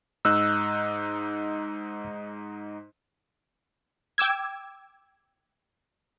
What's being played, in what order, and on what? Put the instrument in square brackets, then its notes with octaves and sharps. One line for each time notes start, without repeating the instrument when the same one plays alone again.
[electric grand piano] G#2 D#4 F#6 [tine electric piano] E6
[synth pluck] G5 D6 E6 G#6